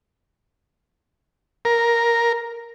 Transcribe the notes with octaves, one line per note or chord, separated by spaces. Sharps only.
A#4